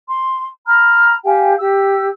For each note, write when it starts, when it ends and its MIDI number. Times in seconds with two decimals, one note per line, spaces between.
0.08 0.44 84
0.66 1.13 82
0.66 1.13 83
0.66 1.13 89
1.25 1.53 67
1.25 1.53 77
1.25 1.53 79
1.25 1.53 80
1.58 2.07 67
1.58 2.07 88